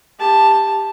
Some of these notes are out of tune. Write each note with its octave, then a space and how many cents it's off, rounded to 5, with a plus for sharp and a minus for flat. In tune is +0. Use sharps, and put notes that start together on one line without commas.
G4 +15 A5 +0